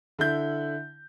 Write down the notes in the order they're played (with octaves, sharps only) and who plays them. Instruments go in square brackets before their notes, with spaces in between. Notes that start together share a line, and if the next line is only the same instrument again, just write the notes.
[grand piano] D3 E4 G6